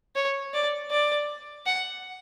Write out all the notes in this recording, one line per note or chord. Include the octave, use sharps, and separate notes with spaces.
C#5
D5
D5
F#5